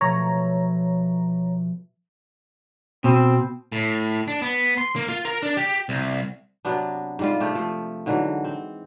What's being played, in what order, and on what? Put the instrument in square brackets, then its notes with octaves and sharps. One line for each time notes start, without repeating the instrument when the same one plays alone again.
[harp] B2 F3 A3 [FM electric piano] C#5 A#5
[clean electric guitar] B2 [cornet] C4
[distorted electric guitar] A2
D4
B3
C6
A#3
F4
A#4
D4
G4
C2
[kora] C3 F#3 B3 D4
G#2 G3 F4
C3 A3 G4
F3 A3
G#2 D3 E3 F#3
C4